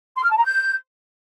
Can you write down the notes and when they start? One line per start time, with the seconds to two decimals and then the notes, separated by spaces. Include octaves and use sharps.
0.16 C6
0.23 F6
0.30 A5
0.37 A#5
0.44 G6